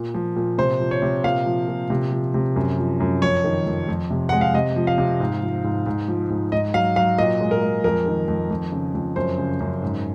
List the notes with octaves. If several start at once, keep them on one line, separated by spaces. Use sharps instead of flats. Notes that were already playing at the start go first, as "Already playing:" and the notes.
Already playing: A#2
F3
A#2
C3 C5
F3
C#5
C3
A#2 F5
F3
A#2
C3
F3
C3
F#2
F3
F#2
F2 C#5
D#3
F2
F2
C3
G#3 F#5
F5
C3 D#5
F3
F5
C3
G#2
F3
G#2
G#2
F3
G#2
G#2 D#5
F#3 F5
F#3 F5
A#2 D#5
G#3
A#4
G#3
F2 A#4
D#3
F2
F2
C#3
F2
F#2 C5
C#3
F#2
G#2